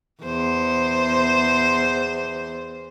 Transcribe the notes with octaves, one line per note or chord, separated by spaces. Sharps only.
E2 C5